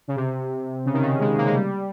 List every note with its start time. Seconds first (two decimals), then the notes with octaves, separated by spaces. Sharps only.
0.08 C#3
0.16 C3
0.86 C#3
0.93 D#3
1.02 C#3
1.20 G#3
1.37 A#3
1.46 G#3
1.55 G3